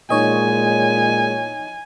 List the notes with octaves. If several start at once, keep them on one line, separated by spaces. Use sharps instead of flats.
A#2 G#3 D#4 C#5 D#5 G#5